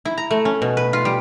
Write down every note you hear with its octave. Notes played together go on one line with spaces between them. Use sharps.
E4
A#5
A3
C#4
B2
B4
F4
G3